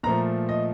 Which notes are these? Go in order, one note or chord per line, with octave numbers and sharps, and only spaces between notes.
A#2 F3 A3 A#5
D#5